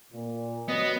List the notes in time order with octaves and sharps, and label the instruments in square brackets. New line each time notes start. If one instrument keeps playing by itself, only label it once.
[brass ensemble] A#2
[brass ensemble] F#3 F#4 [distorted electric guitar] B3 [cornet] D#5